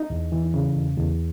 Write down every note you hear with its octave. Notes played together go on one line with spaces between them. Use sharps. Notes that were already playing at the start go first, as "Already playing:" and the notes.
Already playing: D#4
E2
E3
C#3
E2
E2